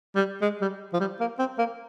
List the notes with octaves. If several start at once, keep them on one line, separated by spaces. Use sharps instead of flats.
G3
G#3
G3
F3
G3
A#3
C4
A#3